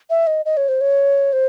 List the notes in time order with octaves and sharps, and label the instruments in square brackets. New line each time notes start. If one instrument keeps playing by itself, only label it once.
[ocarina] E5
D#5
D#5
C#5
C5
C#5
C5